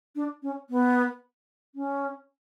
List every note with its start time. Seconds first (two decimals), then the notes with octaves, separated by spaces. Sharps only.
0.16 D4
0.43 C#4
0.70 B3
1.75 C#4